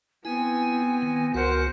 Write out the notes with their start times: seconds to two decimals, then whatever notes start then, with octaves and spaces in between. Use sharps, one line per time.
0.25 B3 C4 E4 G#5
1.02 D#3
1.34 C#2 F#4 A#4 C5 F#5